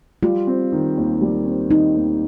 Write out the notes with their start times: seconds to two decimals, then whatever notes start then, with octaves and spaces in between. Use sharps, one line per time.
0.23 G3 F4
0.47 C4
0.72 D#3
0.97 D#2
1.21 G3
1.46 C4
1.71 D#3 D#4
1.95 D#2